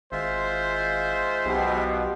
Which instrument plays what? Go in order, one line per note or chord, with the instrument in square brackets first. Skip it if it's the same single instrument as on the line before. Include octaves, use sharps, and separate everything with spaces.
[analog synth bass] G#1 [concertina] G#3 F4 E5 [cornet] C5
[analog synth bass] B1 [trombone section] B2 G4